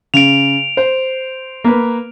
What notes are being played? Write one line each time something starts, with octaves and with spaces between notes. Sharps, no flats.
C#3 D7 F7
C5
A#3 B4